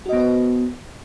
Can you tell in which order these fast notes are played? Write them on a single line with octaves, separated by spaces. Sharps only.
F#4 D#5 B3 C5 B4